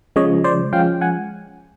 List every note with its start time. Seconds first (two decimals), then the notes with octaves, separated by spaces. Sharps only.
0.16 C#3 F3 G#3 C#5 D#5
0.44 C5 D5
0.73 F3 G#3 C#4 F5 G5
1.01 F#5 G#5